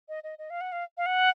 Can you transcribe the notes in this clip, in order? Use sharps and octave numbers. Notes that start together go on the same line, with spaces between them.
D#5
D#5
D#5
F5
F#5
F5
F5
F#5